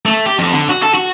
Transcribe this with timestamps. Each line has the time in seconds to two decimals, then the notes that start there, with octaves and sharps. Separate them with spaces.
0.06 A3
0.26 G4
0.39 F2
0.53 D3
0.69 F#4
0.83 A4
0.94 F#4